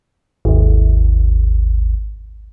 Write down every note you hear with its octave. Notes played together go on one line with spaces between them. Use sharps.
G#1 D#2